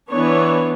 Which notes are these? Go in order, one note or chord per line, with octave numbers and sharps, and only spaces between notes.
E3 B3 D4 C#5